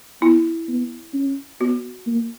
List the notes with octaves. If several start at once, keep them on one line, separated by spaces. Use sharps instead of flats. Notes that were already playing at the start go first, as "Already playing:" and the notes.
B3 E4
B3
C#4
B3 F#4
A#3